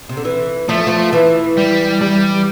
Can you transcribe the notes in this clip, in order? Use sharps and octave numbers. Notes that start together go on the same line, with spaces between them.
C3
D3
E3
F3 A3
F3
E3
G3
G3